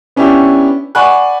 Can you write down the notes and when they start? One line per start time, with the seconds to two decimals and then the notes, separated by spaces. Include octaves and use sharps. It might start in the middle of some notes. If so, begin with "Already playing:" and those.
0.16 B3 C#4 D4 E4 G4
0.95 D5 F#5 G#5 B5 C#6 F#6